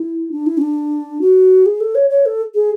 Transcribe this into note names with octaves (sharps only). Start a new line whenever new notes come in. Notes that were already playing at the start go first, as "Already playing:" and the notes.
Already playing: E4
D4
E4
C#4
D4
F#4
G#4
A4
C#5
C#5
A4
G#4